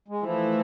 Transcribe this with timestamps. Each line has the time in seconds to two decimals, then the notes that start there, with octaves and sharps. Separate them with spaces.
0.08 G#3
0.23 E3 F3 A3 E4